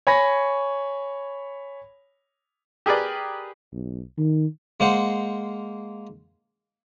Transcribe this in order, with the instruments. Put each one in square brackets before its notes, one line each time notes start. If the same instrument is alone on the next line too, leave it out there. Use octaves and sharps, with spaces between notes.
[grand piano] C#5 G#5 B5 C#6 A#6
[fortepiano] G4 G#4 A#4 B4 D5
[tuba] B1
D#3
[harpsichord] G#3 A#3 C5 F#5